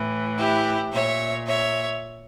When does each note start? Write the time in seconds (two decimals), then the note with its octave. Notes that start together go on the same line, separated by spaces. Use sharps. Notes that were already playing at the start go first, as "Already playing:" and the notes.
Already playing: A2 E3
0.37 E4 G4
0.92 A#2 C#5 E5
1.47 C#5 E5